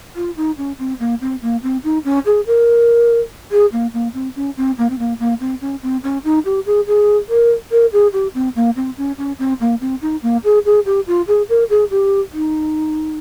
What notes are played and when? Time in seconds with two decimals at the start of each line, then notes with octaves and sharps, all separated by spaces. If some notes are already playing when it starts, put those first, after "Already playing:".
0.16 F4
0.37 D#4
0.58 C#4
0.79 C4
1.00 A#3
1.21 C4
1.42 A#3
1.63 C4
1.84 D#4
2.05 C#4
2.26 G#4
2.47 A#4
3.51 G#4
3.72 A#3
3.93 A#3
4.14 C4
4.36 C#4
4.57 C4
4.78 A#3
4.90 C4
4.99 A#3
5.20 A#3
5.40 C4
5.61 C#4
5.83 C4
6.03 C#4
6.24 D#4
6.45 G4
6.66 G#4
6.87 G#4
7.29 A#4
7.71 A#4
7.93 G#4
8.13 G4
8.34 C4
8.56 A#3
8.76 C4
8.98 C#4
9.18 C#4
9.39 C4
9.60 A#3
9.81 C4
10.02 D#4
10.23 A#3
10.44 G#4
10.65 G#4
10.86 G4
11.07 F4
11.28 G#4
11.49 A#4
11.70 G#4
11.91 G4
12.33 D#4